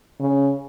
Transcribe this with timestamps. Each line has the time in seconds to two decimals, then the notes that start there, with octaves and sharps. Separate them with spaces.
0.20 C#3